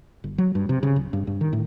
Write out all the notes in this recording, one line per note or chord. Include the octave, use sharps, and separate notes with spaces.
G1
F#3
G2
C3
C#3
D1
G2
G2
D#3
A2